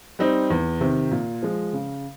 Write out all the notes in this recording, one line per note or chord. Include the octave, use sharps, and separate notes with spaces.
G3 C4 D#4
E2
C3 D#3
A#2
F3 G#3
C#3